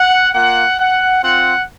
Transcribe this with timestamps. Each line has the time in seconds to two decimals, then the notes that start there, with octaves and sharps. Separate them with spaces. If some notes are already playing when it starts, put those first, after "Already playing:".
Already playing: F#5
0.34 A#3 F4 F#5
0.79 F#5
1.23 C4 F4 F#5